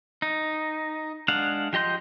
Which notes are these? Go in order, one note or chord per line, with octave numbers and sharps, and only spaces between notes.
D#4
G#3 D4 F5 F#5
F3 G4 D#5 C6 G6